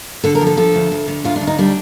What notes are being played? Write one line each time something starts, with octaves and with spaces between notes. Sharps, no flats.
D3 A4
A#4
F3
A4
F3 A4
D2
D2
D3
D2 F4
D4
D2
D#4
G3 D4